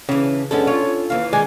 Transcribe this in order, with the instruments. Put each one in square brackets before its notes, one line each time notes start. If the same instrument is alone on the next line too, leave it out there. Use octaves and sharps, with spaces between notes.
[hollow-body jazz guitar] C#3 [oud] E3 D4
[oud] F#2 G#3 B3 [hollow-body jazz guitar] C#4 D4 A4
[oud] F4 [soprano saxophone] C#5
[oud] D#2 E3 [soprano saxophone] F5
[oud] D#3 C#4 [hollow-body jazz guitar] G#3 D5 [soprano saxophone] G#5